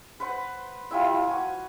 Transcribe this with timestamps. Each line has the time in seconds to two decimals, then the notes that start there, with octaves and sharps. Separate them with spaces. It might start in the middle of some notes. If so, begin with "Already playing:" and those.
0.20 B4 C5 F#5
0.91 F3 G3 E4 E5
1.05 F3
1.27 F#4 G#5